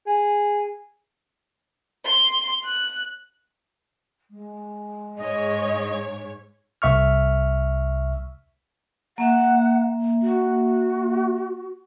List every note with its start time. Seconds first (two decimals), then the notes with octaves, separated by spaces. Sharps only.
0.07 G#4
2.05 C6
2.64 F#6
4.31 G#3
5.18 G#2 C#5 D#5
6.82 C2 E5 C#6 F6
9.18 A#3 E5 F#5
10.22 F#4